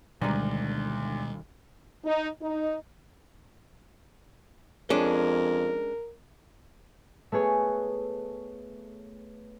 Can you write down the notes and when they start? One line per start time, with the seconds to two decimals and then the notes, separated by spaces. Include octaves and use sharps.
0.22 D2 B2 D#3 G3 G#3 D#4
2.05 D#4
2.42 D#4
4.90 F2 G#3 C#4 D4 A#4
7.32 A3 B3 G#4 C#5